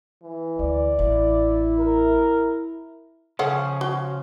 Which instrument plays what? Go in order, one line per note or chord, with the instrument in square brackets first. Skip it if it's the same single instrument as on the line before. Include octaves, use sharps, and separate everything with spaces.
[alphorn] E3
[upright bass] D2 [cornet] D5
[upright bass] A1 [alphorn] E4
[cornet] A#4
[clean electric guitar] C#3 F3 C#4 [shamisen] G#4 F5 F#5
[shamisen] F#4